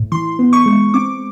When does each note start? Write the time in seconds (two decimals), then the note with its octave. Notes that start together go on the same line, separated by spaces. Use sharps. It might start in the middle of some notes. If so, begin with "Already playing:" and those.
Already playing: A2
0.12 E3 C6
0.39 B3
0.53 C#6
0.66 G#3
0.94 C4 D6